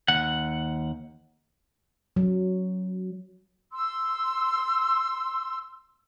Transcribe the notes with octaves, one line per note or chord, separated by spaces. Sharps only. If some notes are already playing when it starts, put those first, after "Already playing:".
D#2 F#5
F#3
C6 E6